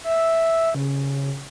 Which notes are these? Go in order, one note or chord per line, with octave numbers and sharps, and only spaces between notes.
E5
C#3